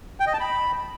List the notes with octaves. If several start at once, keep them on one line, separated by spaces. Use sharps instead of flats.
G5
D#5
A5
B5